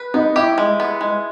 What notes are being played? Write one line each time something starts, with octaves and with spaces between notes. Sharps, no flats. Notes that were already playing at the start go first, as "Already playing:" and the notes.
Already playing: B4
B3 D#4
E4 G4
G#3
B3
G#3